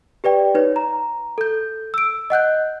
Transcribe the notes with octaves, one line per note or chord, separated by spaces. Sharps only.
G4 B4 D5 G5
D#4 B4 C#5
A#5
A4 G6
E6 D7
D#5 F#5 F#6 G6